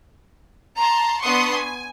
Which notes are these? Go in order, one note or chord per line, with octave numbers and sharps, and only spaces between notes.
A5 A#5 C6
B3 D4 F#5 C6 C#6 D#6
G#5